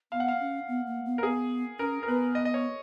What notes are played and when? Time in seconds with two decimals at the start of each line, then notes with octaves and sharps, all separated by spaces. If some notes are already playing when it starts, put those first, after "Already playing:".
0.12 B3 F5
0.20 F#5
0.28 F5
0.40 C#4
0.68 B3
0.86 A#3
1.05 B3
1.18 A#4
1.23 B3 G#4
1.79 C#4 A#4
2.03 A#4
2.07 B3 B4
2.35 D#5
2.45 D#5
2.54 C#5